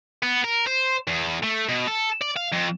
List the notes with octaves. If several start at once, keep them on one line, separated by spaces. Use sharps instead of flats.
B3
A#4
C5
E2
A3
B2
A4
D5
F5
F2